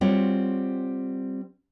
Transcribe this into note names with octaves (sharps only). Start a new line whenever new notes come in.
G3 C4 F4 F#4 C#5